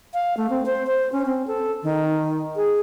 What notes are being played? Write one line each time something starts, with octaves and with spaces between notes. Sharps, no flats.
F5
A3
C4
C5
C5
C#4
C4
A4
D#3
G#4